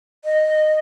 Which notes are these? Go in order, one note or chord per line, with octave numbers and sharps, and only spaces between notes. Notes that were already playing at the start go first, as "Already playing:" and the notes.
D#5